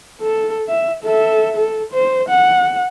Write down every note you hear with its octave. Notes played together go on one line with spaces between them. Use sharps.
A4
E5
A4 E5
A4
C5
F#5